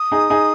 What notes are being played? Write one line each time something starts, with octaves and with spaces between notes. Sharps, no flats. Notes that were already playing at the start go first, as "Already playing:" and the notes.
Already playing: D#6
D#4 G#4
D#4 G#4